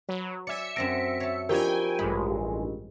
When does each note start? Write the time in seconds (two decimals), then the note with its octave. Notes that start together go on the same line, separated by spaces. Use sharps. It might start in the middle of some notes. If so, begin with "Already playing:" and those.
0.09 F#3 B4
0.47 D5 E5 G#5 C#7
0.76 F#2 C4 A4 A#6 D7
1.20 C#5 A5
1.49 F3 D4 D#4 F4 G4 A#4 G5 G#5
1.99 A1 G2 G#3 B5